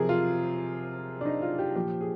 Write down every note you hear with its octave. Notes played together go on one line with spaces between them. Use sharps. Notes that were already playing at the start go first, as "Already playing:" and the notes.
Already playing: C3 F3 G#4 A#4
F4
D4
D#4
F4
G4
A#2 F3 G4
G#4